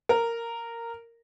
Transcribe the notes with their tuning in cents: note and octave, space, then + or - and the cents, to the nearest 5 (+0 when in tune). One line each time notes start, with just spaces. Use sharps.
A#4 -10